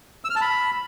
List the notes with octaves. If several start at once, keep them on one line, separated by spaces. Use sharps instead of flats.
E6
F6
A5
B5